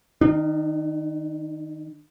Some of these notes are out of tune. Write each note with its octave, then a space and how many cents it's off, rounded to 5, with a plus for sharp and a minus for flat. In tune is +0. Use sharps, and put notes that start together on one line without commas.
D#3 +0 D4 +40